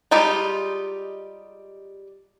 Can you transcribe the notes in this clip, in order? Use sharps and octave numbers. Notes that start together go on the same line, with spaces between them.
G3 G#3 D#4 F4 G4